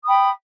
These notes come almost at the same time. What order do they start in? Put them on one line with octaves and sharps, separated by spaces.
D#6 B5 G5